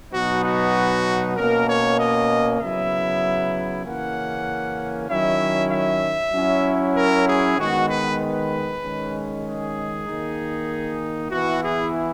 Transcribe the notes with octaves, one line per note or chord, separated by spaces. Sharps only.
B2 F#3 B3 D#4 F#4
F#4
B2 A#3 C#4 A#4
C#5
D#5
C#3 F#3 B3 E4 E5
C#3 E3 A#3 C#4 F#5
D#3 F#3 C#4 E4 E5
E5
F#3 C#4 E4
A#4
G#4
D#3 G#3 B3 F#4
B4
B4
D#3 G#3 C#4
G#4
D#3 A#3 D#4
E3 B3 E4 F#4
G#4